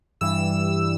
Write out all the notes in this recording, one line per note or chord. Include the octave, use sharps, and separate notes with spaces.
G2 E3 G3 E6